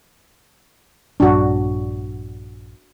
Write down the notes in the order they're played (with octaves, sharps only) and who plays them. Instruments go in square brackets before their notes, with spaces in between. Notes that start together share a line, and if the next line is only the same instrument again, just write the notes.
[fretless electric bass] A#1 G2 [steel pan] D4 F#4